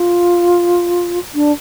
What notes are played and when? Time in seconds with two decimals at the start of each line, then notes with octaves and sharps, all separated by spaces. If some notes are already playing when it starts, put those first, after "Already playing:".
Already playing: F4
1.34 D4